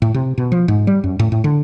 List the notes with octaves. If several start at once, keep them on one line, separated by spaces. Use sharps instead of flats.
A2
C3
B2
F3
G#2
G3
F#2
A2
A2
D3